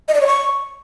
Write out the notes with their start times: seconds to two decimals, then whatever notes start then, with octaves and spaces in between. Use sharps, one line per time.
0.08 D#5
0.14 D5
0.21 C#5
0.27 C#6